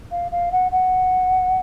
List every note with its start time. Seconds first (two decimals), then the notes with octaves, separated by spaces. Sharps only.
0.11 F5
0.31 F5
0.52 F#5
0.71 F#5